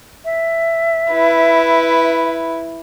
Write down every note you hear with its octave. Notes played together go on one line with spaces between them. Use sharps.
E5
E4 B4